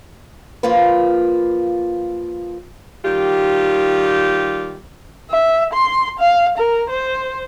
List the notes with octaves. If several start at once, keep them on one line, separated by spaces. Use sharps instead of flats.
F3 A#3 F4 B4
D#3 G3 F4 G4
E5
C6
F5
A#4
C5